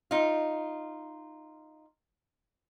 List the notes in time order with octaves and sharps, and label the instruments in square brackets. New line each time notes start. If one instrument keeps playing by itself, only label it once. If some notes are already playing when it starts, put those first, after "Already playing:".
[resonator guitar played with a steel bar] D#4 F4